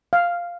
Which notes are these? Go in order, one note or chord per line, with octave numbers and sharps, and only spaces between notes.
F5